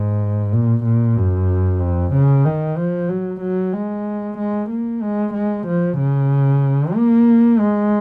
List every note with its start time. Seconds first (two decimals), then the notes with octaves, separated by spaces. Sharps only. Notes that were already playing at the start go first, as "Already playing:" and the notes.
Already playing: G#2
0.52 A#2
0.84 A#2
1.17 F#2
1.81 F2
2.13 C#3
2.45 D#3
2.77 F3
3.09 F#3
3.41 F#3
3.73 G#3
4.38 G#3
4.69 A#3
5.02 G#3
5.34 G#3
5.67 F3
5.98 C#3
6.94 A#3
7.59 G#3